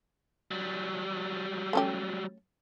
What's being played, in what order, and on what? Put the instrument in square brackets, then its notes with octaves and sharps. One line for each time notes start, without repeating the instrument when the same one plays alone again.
[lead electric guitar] F#3 G3
[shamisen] A3 C#4 G4